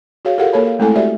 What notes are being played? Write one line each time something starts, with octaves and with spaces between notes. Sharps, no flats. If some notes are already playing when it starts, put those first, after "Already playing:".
F#4 G#4 C#5 F5
F4 G4 A4 A#4 F5 F#5
A#3 A4 A#4 C#5 A5 B5
F5
G#3 A3 C4 E4 A4 G#5
F#4 G4 C5 D5 E5